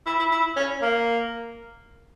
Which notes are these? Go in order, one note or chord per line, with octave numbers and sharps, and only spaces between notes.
E4
E4
E4
C#4
A#3